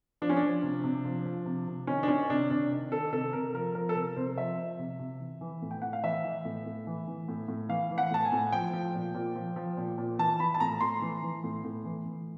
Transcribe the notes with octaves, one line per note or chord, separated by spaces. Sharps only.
F3 D4
C#4
D4
F3
C3
C3
F3
F3
C3
C3
D#3 C#4
D4
D#3 C#4
C3 D4
C3 D4
D#3
D#3 A4
C3 A4
C3 A#4
F3 A#4
F3 A#4
A4
C3 A#4
C3 C5
F3 E5
F3
C3
C3
E3
E3
A2
G5
A2 F#5
F5
E3 E5
E3
A2
A2
E3
E3
A2
A2
E3 F5
E3
F#5
A2 A5
G#5
A2
F3 G5
F3
A#2
A#2
F3
F3
A#2
A#2
E3 A5
E3 B5
A5
A2 A#5
A2 C6
E3
E3
A2
A2
E3
E3